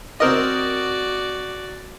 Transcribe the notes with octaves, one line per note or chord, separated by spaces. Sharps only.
C4 F#4 A#4 D5 D#5